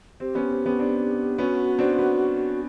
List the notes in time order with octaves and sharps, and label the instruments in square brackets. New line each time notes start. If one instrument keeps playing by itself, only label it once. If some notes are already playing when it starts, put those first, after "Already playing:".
[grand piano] C4 [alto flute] G4
[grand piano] B3 C#4
C4
B3 C#4
C4 D4
[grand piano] B3 C#4 [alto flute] F#4
[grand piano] C4 D4
B3